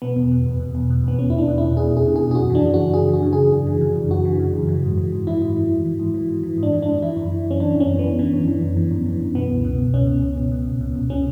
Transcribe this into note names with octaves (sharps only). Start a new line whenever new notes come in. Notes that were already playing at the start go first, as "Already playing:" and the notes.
B2 B3
E2
B2
E2
B2
E2
B2
E2 B3
B2 C#4
E4
E2 D4
B2
E2 E4
B2 G#4
E2
G#4
B2
G#4
E2
G#4
F#2 F#4
E3 D4
C#3
F#4
F#2
F#2 G#4
E3 F#4
C#3
G#4
F#2
F#2
E3
C#3
F#2
F#2 F#4
E3
C#3
F#2
E3
G#2
E3
G#2
E3 E4
G#2
E3
G#2
E3
G#2
E3
G#2
E3
G#2 D4
E3
G#2 D4
E3 E4
F#2
E3
F#2 C#4
E3 D4
F#2
C#4
E3
F#2 B3
E3 C#4
F#2
E3
F#2
E3
F#2
E3
F#2
B2 B3
C#2
B2
C#2
B2 C#4
C#2
B2
C#2
B2
C#2
B2
C#2
B2 C#4